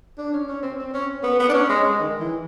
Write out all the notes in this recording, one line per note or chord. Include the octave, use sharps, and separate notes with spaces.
D4
C#4
C#4
C4
C4
C#4
B3
B3
D4
C#4
G#3
G#3
D#3
E3